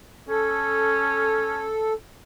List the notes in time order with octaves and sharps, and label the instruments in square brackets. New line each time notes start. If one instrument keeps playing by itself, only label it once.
[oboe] C#4 [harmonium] A4